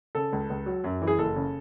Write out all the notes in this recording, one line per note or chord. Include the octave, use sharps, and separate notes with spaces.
C#3 A4
C#2
C#2
F#3
F#2
E3
G#4
F#1 A4
C#3